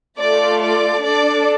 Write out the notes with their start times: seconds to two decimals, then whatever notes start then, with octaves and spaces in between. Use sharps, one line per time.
0.18 A3 F4 A4 D5
0.61 D5
1.04 D4 A4 D5